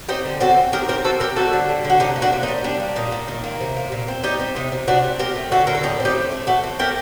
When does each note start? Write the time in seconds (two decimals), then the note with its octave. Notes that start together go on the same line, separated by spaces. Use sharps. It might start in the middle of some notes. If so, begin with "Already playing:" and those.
0.08 C4 D#4 G4
0.25 D3
0.40 C4 F#4 A4
0.57 C4
0.72 D#3 G4 A#4
0.88 C4 G4 A#4
1.04 C4 F#4 A4
1.20 C4 G4 A#4
1.36 G3 F#4 A4
1.53 D3
1.69 G3
1.84 D3
1.90 F#4
2.00 C3 D#4 G4
2.16 A#3
2.22 D4 F#4
2.32 C3
2.43 D#4
2.48 G3
2.64 G3 D4
2.80 A#3
2.96 A#2 D#4
3.12 A#2
3.28 D#3
3.44 A#3
3.60 C3
3.77 A#3
3.92 A#2
4.08 C4
4.23 G3 D#4 G4
4.39 C4
4.56 C3 D#4
4.72 C3
4.88 C3 D4 F#4
5.03 G3
5.19 C4 G4 A#4
5.36 A3
5.51 D3 F#4 A4
5.67 D3 A#4
5.75 A4
5.83 A2 D#4 G4
6.00 C4
6.05 D#4 G4
6.15 A3
6.32 A3
6.47 A3 F#4 A4
6.63 C4
6.79 A3 G4 A#4